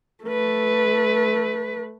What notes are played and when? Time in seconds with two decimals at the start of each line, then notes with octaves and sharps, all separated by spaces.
0.24 A3 B4